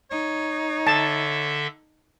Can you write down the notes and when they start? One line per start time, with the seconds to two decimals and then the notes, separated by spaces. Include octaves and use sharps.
0.11 D#4 C#5
0.87 D3 A4 E5 A5